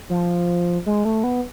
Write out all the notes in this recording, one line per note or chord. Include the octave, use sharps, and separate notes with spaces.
F3
G#3
A3
B3